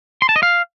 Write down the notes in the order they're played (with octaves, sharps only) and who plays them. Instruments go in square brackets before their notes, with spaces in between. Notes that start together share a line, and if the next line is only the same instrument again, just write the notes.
[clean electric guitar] C6
A5
D#5
F5